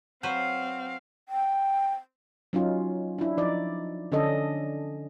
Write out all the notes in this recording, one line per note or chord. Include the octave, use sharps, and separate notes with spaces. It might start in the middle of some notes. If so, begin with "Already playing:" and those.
F#3 C4 B4 C5 F5
G5
F#3 C#4 D#4 F4
D4 E4
F3 D#4 D5
D3 C#4 D4 A4 D#5